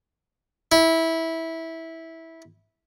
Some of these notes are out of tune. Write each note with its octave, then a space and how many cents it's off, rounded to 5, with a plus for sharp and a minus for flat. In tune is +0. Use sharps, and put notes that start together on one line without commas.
E4 -15